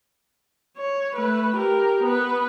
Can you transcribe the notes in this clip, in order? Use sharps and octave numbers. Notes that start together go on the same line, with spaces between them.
C#5
A3 B4
G4 A#4
B3 B4